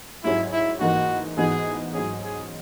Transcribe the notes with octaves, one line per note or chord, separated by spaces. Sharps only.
G#2 F#3 C#4 E4 G#4 C#5
E4
G#2 E3 A#3 D#4 F#4
G#2 E3 B3 D#4 F#4 G#4
G#2 F#3 C#4 G#4
G#4